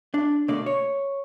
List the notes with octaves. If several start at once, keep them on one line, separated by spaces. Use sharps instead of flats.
D4
B2 D3 A3 A#3 D5
C#5